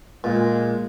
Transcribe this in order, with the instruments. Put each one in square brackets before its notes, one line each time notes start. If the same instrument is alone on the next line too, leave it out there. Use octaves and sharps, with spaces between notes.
[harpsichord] A#2 [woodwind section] G#3